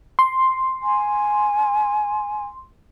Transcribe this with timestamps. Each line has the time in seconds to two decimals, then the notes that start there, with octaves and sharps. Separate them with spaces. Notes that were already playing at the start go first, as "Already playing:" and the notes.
0.19 C6
0.83 G#5